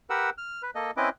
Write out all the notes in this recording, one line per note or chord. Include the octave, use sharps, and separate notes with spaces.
G4 A#4 B4 F#5 E6
F6
B4
A#3 A4 D#5
C4 C#4 E4 B4 D#5 D6